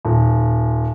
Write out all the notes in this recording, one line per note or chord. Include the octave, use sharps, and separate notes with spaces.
D#1